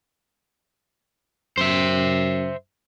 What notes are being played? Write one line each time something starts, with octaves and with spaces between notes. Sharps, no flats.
F#2 C5 E5